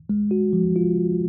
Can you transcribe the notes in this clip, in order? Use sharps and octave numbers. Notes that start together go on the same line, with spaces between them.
G#3
F#4
F3
F4